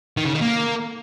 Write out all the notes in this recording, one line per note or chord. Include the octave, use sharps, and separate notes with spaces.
D#3
C#3
D#3
A#3